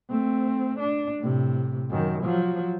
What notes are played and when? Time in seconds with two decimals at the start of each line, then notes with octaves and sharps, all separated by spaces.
0.10 A3 C4
0.80 D4
1.20 A2 C3
1.90 F#2 D#3
2.23 F3 F#3